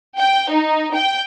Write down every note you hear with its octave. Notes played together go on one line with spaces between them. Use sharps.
G5
D#4
G5